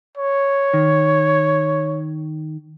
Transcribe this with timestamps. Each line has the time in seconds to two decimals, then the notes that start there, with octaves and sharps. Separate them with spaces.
0.17 C#5
0.74 D#3